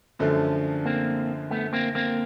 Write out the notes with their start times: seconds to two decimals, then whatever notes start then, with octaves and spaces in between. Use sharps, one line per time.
0.19 F#2 D3 F3 A3
0.85 A#3 C4
1.51 A3 B3
1.73 A#3 C4
1.95 A#3 C4